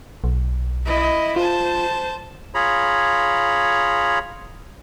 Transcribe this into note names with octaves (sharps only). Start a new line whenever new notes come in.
B1
E4 D#5
F4 C5 A5
F4 G#4 C#5 A#5 B5